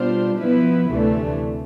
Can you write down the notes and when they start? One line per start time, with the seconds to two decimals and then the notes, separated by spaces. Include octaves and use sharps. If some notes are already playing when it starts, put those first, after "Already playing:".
Already playing: B2 G3 D4 F4 C5
0.40 F3 B3 E4 B4
0.90 D2 C3 E3 A3 D4